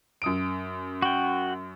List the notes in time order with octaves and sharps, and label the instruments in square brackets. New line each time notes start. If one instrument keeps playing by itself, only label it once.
[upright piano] F#2 D#6 D7
[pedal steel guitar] F#4 G5